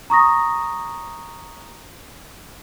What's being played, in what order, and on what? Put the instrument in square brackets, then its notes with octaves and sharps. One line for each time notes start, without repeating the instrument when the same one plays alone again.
[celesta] A#5 C#6 D#6 A#6